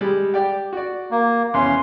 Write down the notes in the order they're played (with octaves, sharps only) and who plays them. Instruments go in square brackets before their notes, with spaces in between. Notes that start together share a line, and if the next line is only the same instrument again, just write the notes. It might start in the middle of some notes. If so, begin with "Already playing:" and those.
[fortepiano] G3 G#3
G4 D5 G5
F#4 D5
[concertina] A#3
[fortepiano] E2 [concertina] C#4 C6